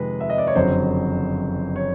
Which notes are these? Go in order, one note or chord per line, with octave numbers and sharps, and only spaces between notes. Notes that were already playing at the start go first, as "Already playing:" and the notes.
Already playing: F2 C3 D#3 G#3 B4
E5
D#5
D5
C#5
F#1 F2 D3 F#3 C5
C#5